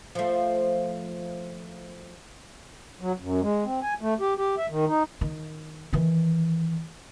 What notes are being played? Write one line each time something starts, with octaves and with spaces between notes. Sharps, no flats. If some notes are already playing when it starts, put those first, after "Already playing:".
F3 A3
F#3
F#2
G#3
C4
G#5
A3
G4
G4
E5
D#3
D#4
D#3
D#3 E3